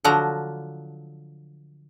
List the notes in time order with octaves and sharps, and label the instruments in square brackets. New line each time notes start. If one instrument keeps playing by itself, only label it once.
[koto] D3 F3 F#3 A#5